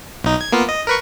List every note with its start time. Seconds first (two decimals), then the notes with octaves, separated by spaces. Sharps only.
0.24 B1 D#4
0.41 G#6
0.52 A#3 B3 F4
0.69 D#5
0.87 A#4 B4 C#6